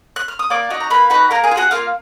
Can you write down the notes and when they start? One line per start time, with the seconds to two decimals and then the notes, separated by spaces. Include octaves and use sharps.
0.16 F#6
0.28 F6
0.39 D#6
0.50 A#3 D5 D6
0.70 D#4 F#4
0.80 A#5
0.90 A#3 B4 B5
1.10 D#4 F#4 B4 B5
1.31 A#3 A#4 A#5
1.44 G#4 G#5
1.51 F4
1.56 F#4 G#4 F#5
1.71 A#3 F4 F5